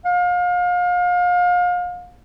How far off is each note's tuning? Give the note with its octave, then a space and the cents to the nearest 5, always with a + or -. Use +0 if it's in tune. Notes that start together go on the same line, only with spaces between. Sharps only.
F5 +35